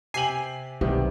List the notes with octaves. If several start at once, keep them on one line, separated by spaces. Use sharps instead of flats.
C3 G4 G#5 C7 F#7
B1 C3 D#3 G3 B3